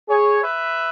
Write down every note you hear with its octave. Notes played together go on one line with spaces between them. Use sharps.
G#4 C#5
B4 E5